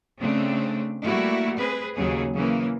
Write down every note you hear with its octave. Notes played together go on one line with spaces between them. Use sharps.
C#3 A3 C4 D4
G3 A3 A#3 E4 F#4
C4 G#4 B4
D#2 C#3 F#3 G#4
C#3 E3 A#3